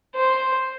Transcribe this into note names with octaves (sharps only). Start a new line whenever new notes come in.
C5